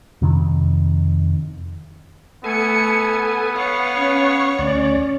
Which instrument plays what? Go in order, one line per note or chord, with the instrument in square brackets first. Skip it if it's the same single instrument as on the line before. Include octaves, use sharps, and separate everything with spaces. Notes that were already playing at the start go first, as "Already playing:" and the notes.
[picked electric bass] F2 C3 D#3
[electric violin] A3 C#7 [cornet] B3 [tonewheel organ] A4 G#5
[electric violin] C#5 [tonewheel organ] F5 F#5
[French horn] C#4
[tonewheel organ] D2 D5 [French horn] C#4